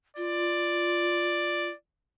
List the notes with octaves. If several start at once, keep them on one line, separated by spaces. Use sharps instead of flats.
F4 D5